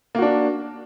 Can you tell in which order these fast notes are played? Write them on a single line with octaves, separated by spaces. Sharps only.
A#3 F#4 D4